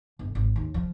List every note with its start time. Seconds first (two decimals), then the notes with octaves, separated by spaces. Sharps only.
0.19 G1
0.35 G#1
0.56 D#2
0.74 F3